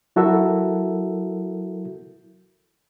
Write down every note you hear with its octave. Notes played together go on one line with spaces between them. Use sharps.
F#3 E4 F#4 A4 A#4 E5